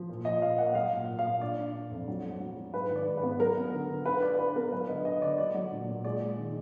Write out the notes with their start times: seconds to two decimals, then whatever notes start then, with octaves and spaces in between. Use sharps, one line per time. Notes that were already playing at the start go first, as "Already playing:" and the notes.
Already playing: F3
0.09 A#2
0.25 F3 D#5
0.42 A#2 F5
0.58 A#3 F#5
0.75 F#3 F5
0.91 A#2
1.08 A#2
1.19 F5
1.25 A#2
1.41 D4 D5
1.58 D4
1.75 D4
1.91 F2
2.08 F#3
2.24 F#3
2.40 F#3
2.57 F#3
2.74 G#2 B4
2.90 D#3
2.96 D5
3.07 G#2
3.17 B4
3.23 B3
3.39 F#3 A#4
3.57 B3
3.74 D3
3.90 D3
4.06 D4 B4
4.22 D4 D5
4.39 D4 B4
4.56 B3 A#4
4.72 F#3 B4
4.89 D3 D#5
5.05 D4 D#5
5.22 D3 D5
5.38 F#3 D5
5.54 F#3
5.71 A#2
5.88 A#2
6.04 G#3 D5
6.21 G#3
6.38 D#3